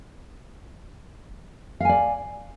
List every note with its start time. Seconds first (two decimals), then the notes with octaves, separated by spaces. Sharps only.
1.80 F5
1.85 G#5
1.89 D5